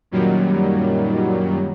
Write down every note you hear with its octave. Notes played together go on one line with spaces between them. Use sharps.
F#2 A#2 D#3 F#3 G3